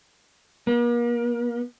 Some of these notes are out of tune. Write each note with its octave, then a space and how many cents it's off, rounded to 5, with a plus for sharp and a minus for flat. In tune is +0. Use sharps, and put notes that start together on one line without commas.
A#3 +40